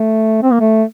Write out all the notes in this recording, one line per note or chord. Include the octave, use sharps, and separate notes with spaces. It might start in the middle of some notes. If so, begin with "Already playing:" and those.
Already playing: A3
C4
A#3
A3